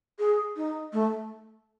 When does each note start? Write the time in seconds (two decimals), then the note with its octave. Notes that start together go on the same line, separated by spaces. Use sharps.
0.19 G#4
0.56 D#4
0.93 A3